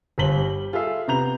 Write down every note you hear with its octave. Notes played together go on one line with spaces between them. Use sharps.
G1 G4 C5 B6 F#7 G7
G3
F4 G#4 A4 E5 C7
C3 B3 A#5 G6 F7